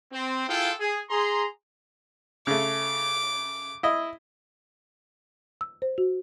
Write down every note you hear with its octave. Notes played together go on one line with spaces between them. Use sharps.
C4
E4 F4 G#4 A4 F5 G5
G#4
G#4 A#5 C6
C#3 A3 D6
E4 D#5
E6
C5
F#4